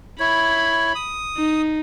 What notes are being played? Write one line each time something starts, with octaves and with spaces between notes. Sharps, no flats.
E4 C#5 B5
D#6
D#4